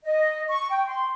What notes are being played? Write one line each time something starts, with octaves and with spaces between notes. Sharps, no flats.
D#5
C#6
G5
C6